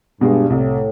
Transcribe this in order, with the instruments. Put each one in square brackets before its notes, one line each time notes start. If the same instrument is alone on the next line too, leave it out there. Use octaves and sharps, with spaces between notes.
[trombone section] G2 [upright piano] B2 G#3
[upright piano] C2 [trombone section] A2